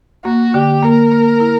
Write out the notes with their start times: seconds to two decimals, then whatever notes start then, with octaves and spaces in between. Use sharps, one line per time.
0.24 A#3 F#4
0.54 D3 G4
0.83 A#3 A#4
1.12 A#3
1.40 E4